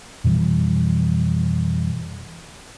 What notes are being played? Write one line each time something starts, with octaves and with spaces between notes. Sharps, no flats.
F2 B2 E3 G3